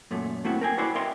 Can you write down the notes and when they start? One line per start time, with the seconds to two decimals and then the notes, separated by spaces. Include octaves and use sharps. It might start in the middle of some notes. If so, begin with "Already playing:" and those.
0.11 F#2 A#2 A3
0.44 A3 A#3 C4 E4 F#4
0.61 A#4 G5 G#5
0.78 E4 F#4 B4 C5 D5 E5
0.95 A#4 D#5 E5 G5 C6